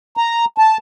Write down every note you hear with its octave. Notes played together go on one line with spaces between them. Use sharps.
A#5
A5